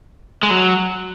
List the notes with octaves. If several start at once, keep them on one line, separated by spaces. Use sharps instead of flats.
G#3
F#3